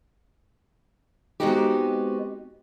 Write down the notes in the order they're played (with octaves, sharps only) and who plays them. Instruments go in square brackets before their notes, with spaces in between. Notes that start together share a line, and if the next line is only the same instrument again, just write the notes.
[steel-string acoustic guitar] G#3 B3 C4 D#4 F#4 G4